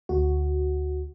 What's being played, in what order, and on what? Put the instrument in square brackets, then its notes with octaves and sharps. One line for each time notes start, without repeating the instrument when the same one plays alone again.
[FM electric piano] D2 F#4